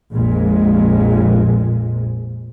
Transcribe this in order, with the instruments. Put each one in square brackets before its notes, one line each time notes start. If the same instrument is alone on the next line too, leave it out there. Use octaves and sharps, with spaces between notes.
[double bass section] A#1 F2 A#2 G#3